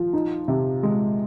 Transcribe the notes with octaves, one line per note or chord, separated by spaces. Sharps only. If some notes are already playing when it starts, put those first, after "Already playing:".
Already playing: F3
D#4
C3
G#3